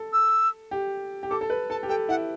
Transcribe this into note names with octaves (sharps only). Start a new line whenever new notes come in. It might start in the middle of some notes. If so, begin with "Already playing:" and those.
Already playing: A4
E6
G4
G4
A4 D6
A4
B4
A4 A5
G4
A4 G5
E4 F#5